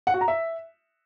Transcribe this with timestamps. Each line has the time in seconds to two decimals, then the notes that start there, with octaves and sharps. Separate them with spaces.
0.07 F#5
0.14 F#4
0.21 A#5
0.28 E5